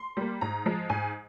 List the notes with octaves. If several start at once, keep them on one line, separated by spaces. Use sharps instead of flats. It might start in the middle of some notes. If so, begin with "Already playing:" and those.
Already playing: C6
G3 A#3
G#2 A#5
F3 G#3
G#2 G#5